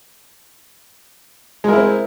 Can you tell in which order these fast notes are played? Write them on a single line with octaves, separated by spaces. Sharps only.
G#3 A#4 E4 C4